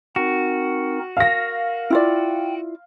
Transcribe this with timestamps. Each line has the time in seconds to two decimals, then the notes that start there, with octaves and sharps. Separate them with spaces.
0.16 C4 D#4 F#4 A#4
1.17 A#4 F5 A#6
1.90 E4 F4 D5 G5